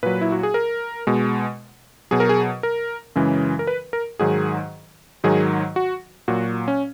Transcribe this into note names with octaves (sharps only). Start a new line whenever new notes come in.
A#2 F#3 B4
E4
F#4
G#4
A#4
B2 G#3
B2 F#3 G#4
A#4
G#4
A#4
F#2 C#3 E3 G#3
A#4
B4
A#4
G#2 D#3 F#3 G#4
G#2 D#3 F#3 G#4
F#4
A#2 F#3 F#4
C#4